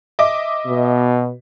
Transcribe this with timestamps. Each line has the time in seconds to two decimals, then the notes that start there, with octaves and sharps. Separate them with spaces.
0.19 D#5 E5 D6
0.66 B2